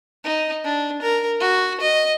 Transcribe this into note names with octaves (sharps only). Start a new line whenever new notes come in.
D#4
D4
A#4
F#4
D#5